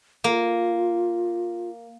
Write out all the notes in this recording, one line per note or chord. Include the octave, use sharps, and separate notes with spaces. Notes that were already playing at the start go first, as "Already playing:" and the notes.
A#3 F4